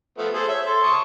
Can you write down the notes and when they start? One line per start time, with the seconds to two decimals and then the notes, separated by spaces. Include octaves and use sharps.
0.18 F3 A3 B3
0.34 G#4 A4 C5
0.48 C#5 E5
0.66 A4 C6
0.83 A5 C#6 D#6